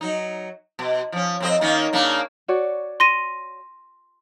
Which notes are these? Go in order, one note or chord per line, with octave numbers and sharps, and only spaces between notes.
F#3 D#4
B2
F3 C#4
F2 C4 D#5
D#3 A#3 C#4
C#3 A#3 D4
F#4 C#5 D5
C6 A#6 D#7